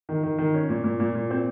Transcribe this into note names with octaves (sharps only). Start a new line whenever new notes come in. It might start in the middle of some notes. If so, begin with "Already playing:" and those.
D#3
D#3
D#3
C#4
A#2
A#2
A#2
A#2
C4